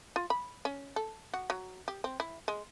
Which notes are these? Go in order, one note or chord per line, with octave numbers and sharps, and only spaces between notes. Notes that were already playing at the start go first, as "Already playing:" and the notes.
F4
B5
C#4
A4
F#4
F#3
G4
C4
E4
G#3